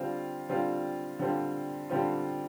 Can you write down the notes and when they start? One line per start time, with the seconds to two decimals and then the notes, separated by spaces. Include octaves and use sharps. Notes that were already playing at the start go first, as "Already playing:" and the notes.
Already playing: D3 G3 C4 F4
0.49 D3 G3 C4 F4
1.19 D3 G3 C4 F4
1.89 D3 G3 C4 F4